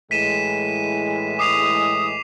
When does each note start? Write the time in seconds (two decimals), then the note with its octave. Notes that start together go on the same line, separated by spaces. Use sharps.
0.11 A2 E3 G#3 B6 D#7 E7
1.39 D6 D#6 C7 F7